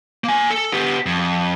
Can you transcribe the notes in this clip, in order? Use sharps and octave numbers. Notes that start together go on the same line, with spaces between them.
A#3 G#5
A4
B3 G4
F2